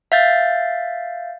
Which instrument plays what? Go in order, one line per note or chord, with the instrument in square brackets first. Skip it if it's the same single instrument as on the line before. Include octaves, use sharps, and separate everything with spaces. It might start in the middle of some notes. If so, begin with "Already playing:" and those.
[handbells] E5 F5 G6 A6